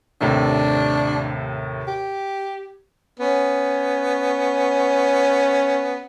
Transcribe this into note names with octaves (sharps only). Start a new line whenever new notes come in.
D#2 A2 C3 D4
G4
B3 C#4